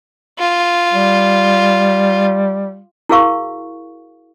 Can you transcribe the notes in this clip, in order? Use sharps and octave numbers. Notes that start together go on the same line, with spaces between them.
F4
G3
E4 F#4 G#4 A#4 F5 C#6